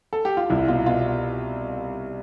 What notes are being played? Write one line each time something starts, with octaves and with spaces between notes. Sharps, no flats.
A4
G4
F4
C2 E4
B2 F4
B2 F4